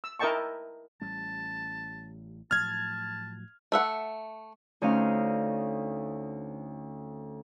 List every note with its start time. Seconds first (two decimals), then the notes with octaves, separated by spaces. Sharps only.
0.04 E6
0.19 E4 A#4 D#5 G5 A5 C#6
1.02 A1 G3 C#4 A5
2.51 A2 F3 F#3 A5 F6 G#6
3.72 A3 E5 F#5
4.82 D2 C#4 D#4 C5 F5